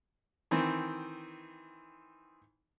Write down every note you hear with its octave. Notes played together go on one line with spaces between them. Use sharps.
D#3 E3 C4